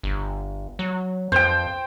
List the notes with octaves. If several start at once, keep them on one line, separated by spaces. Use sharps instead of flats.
G1
F#3
F2 C5 G5